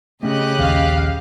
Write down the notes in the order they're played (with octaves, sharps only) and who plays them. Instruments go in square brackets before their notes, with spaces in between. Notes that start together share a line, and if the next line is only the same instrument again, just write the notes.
[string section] C#3 D#5 F#6 [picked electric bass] A3 C#4 [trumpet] G4
[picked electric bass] A#1 D#2 [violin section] F5